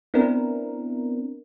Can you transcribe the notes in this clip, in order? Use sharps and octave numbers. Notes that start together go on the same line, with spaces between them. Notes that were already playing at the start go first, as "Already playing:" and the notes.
B3 C4 D4 E4 A#4